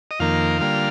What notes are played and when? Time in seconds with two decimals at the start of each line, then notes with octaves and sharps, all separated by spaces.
0.11 D#5
0.20 F2 D#3 A#3 F5
0.61 D3 G3 A#3 F4